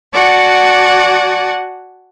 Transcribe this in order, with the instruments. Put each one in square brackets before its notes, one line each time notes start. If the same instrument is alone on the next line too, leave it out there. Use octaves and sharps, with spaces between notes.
[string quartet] F#4 D5 F#5 G#5 A5